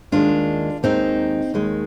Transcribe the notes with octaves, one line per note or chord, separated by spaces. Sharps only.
D#2 D#3 G#3 D4 F4
D#2 D#3 G#3 C4 D#4
D#2 D#3 G#3